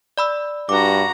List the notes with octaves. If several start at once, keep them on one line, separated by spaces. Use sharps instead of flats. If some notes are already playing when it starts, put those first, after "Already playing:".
D5 B5 E6
G2 F#4 A#5 D6